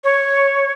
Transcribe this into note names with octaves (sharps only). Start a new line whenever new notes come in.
C#5